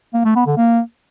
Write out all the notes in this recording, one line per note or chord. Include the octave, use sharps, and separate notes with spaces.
A#3
A3
B3
D3
A#3